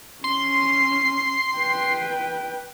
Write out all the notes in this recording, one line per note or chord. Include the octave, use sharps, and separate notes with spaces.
C#4 C6
B4 G5